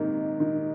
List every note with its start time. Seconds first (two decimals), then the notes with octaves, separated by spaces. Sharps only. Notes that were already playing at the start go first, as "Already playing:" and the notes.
Already playing: G#2 C3 D#3 A#3
0.40 D#3